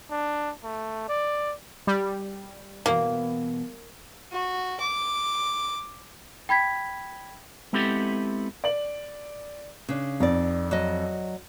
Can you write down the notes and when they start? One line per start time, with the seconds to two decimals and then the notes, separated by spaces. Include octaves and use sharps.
0.11 D4
0.64 A3
1.09 D5
1.87 G3
2.86 B2 E3 A#3
4.32 F#4
4.80 D6
6.49 G5 B5 G#6 B6
7.73 G#3 B3 C4 E4 G4 A4
8.64 D5 F#7
9.89 C#3 D4
10.20 F2 D#4 D5
10.71 F#3 D#5